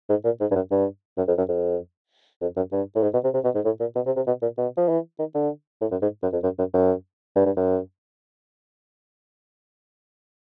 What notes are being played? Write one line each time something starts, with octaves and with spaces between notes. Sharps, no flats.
G#2
A#2
G#2
G2
F#2
G2
F#2
F2
F#2
F2
F2
F#2
G2
A2
G#2
B2
C3
C3
B2
G#2
A2
A#2
B2
C3
C3
B2
A#2
B2
F3
E3
D#3
D3
A2
F#2
G#2
F#2
F2
F#2
F#2
F#2
G2
G2
F#2